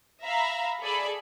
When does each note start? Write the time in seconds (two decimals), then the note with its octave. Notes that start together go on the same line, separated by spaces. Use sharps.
0.22 E5 F5 A#5 B5
0.81 G#4 A4 D5 G#5 B5